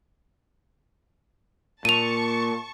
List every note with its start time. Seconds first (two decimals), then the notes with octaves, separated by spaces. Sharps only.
1.85 A#2 A5 C#6 D#7 F7